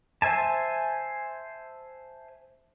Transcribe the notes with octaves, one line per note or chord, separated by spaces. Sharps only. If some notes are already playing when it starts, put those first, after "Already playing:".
C5 E5 G#5 A5